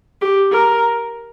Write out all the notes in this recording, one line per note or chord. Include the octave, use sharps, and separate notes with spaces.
G4
A#4